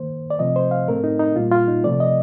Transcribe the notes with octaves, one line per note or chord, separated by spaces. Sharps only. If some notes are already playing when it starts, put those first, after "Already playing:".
Already playing: D#3 A#3 C5
D5
C3 F3 A3 C4 D#5
C5
F5
A2 A3 C4 A#4
D#4
D#4
A#2 G3 A#3 F4
F4
D#4
C3 F3 A3 C4 D5
D#5